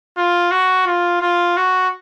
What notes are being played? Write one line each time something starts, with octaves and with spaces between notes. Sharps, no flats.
F4
F#4
F4
F4
F#4